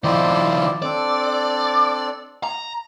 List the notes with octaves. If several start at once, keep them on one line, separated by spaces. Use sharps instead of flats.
D#3 F3 E4 C5 D5
C4 D4 A4 D5
A#5